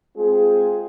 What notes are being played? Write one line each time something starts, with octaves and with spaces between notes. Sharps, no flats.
G#3 C4 F4 G#4